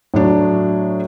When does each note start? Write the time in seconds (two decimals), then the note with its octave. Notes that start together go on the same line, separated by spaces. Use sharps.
0.14 A2 F#3 D4